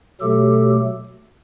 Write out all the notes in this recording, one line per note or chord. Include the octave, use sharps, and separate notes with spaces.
B2 F#3 A3 G4 A4